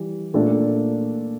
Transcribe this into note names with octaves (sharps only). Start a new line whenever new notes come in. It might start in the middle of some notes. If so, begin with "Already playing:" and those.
Already playing: E3 G3
A#2 A3 D4 A4